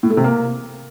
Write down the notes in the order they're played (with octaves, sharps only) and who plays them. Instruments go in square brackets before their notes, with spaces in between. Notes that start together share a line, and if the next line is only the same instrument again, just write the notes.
[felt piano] A2
A3
C3
A#3